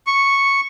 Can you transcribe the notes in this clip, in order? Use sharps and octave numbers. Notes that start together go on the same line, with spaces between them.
C#6